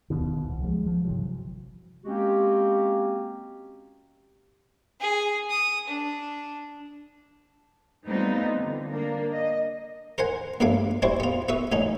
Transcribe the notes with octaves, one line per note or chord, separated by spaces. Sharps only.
D#1 D#2 B2 D#3
C2
F3 G3 G#3
F3
G1 C3 E3 F#3
G#3 A#3 C4 C#4 F#4 G4
G#4
D#6
D4
G3 A3 B3 C4 D#4 F4
D3
A#3 D4 A#4
D#5
A#4 C5 F#5 G#5
A#1 G2 F#3 A3 F5 D6
G3 C4 E4 F#4 C5
B3 F4
B3 F#4 E5 D#6
A1 F#3 C#4 D#4